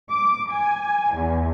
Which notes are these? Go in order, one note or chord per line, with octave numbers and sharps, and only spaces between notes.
D6
G#5
E2